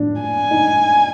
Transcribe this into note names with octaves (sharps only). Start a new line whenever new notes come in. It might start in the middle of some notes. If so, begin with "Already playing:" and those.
Already playing: D4
G#5
D#4